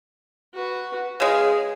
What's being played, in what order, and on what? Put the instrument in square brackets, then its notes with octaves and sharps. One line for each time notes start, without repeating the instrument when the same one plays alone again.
[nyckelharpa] F#4 B4
[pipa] C#3 G#3 [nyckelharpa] G#4